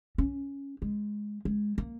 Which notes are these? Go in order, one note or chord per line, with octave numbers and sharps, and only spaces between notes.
C#4
G#3
G#3
A#3